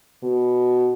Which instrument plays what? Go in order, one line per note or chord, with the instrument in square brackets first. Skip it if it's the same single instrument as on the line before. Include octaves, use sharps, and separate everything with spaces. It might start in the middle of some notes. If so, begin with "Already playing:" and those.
[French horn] B2